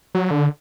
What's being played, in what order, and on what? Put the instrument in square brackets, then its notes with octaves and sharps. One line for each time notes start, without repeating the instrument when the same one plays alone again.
[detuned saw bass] F#3
D3